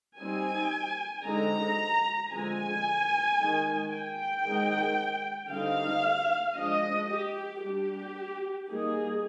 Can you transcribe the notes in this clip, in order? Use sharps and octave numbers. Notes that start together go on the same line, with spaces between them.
G3 C4 D#4 G#5
D3 G#3 C4 D#4 A#5
D3 F3 G#3 C4 G#5
D#3 G#3 D#4
G5
D#3 G#3 C4 D#4
D3 G3 C4 D#4 F5
F3 G#3 D4 D#5
G4
G3 D4 G4
G3 A#3 D#4 G#4